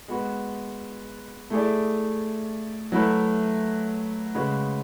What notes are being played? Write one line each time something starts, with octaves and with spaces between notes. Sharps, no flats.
G#3 B3 F#4 B4
A3 E4 G#4 D5
F#3 A3 E4 B4
C#3 G#3 C#4 F#4 B4